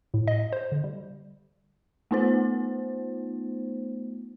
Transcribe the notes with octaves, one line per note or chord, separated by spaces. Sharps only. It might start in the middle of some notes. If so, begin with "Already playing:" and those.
A2
D#5
C5
D3
G3
A3 B3 D#4 F4 C5